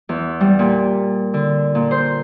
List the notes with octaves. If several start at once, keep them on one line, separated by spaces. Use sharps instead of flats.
E2
G3
A#2
D3
A#2
C5